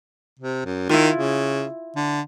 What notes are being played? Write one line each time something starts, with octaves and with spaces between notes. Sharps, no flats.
C3
F#2
D#3 E4 F4
C#3
D3